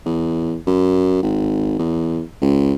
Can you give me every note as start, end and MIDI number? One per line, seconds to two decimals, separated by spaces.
0.06 0.56 40
0.67 1.19 42
1.22 1.75 32
1.79 2.22 40
2.41 2.74 37